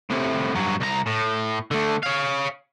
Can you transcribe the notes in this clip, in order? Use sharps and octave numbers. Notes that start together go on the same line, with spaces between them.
A2 C3
G2 F#3
C2 A#5
A2
D3 A3
C#5 F5